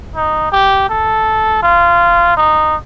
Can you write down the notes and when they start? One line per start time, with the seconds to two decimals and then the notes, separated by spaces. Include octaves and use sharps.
0.15 D#4
0.52 G4
0.89 A4
1.63 F4
2.37 D#4